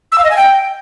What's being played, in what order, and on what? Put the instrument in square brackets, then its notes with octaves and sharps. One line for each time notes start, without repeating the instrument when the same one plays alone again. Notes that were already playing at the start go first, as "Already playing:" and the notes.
[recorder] E6
F5
D#5
G#5
G5